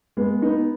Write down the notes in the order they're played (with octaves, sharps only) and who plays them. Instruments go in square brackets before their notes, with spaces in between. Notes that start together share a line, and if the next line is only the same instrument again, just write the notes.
[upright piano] G#3 B3
B3 D#4